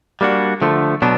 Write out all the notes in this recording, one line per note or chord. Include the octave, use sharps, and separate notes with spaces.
G3 A#3 D4 F#4
D3 F3 A3
B2 F#3 B3 D4